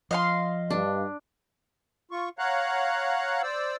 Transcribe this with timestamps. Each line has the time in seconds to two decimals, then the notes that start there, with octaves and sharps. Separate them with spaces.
0.11 F3 D#5 F5 C6
0.70 G2 D4
2.11 F4 C#6
2.38 C#5 F5 F#5 A#5 F#6
3.43 C5 D5 E6